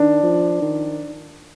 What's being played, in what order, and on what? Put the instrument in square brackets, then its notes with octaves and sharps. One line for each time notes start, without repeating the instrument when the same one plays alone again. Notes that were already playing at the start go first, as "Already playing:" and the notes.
Already playing: [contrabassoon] D#3 [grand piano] D4
[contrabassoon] F3
D#3